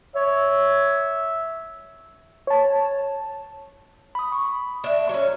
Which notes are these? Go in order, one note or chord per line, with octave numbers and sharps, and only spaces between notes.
C#5 E5
C#5 A5
B5 D#6
C#6
D4 E5
F#3 C#4